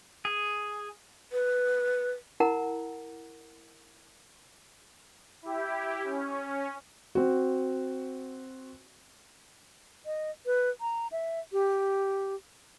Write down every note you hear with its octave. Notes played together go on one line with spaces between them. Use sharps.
G#4
B4
E4 A#4 F#5 A#5
E4 G4
C#4
C4 F#4
D#5
B4
A#5
E5
G4